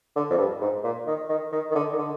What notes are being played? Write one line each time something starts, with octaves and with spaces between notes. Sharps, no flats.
D3
F2
G2
G#2
A#2
D#3
D#3
D#3
D#3
D3
D#3
D3